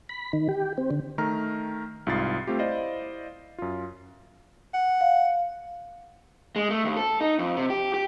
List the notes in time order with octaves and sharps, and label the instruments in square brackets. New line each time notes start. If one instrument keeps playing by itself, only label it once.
[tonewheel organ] B5
D#3
G4
C4
D3
[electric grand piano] D#3 A3 A#5 F6
C2 G#2 F4 D#6 A6 C7
A3 C4 F4 G4
E4 C5 D5 D#5 F5
F#2 F4
[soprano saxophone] F#5
[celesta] F5
[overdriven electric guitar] G#3
A3
D#2
A4
D#4
F2
C3
G4
G4